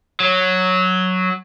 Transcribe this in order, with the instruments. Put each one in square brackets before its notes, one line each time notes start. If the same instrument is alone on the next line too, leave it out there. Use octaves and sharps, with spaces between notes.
[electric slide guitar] F#3